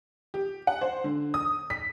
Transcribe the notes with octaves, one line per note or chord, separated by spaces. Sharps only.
G4
F#5
C5
D3
D#6
B6